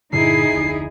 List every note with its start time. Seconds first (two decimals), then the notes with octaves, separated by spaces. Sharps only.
0.13 G2 A#2 D3 D#4 E4 G#4 C7
0.51 F1 D2